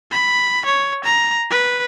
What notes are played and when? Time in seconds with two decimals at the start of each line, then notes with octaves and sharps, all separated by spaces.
0.11 B5
0.66 C#5
1.04 A#5
1.50 B4